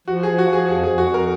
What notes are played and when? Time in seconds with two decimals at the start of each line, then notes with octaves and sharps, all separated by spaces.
0.08 F3 F#4
0.23 G#4
0.28 F3
0.38 F#4
0.48 F3 G#4
0.68 F2 G#4
0.83 G#4
0.89 F2
0.98 F#4
1.08 F2
1.14 A#4